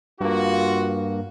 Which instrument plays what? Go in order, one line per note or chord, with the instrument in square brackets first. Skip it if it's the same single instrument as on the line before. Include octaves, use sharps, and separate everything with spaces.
[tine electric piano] G2 A#3 [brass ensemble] F4 F#4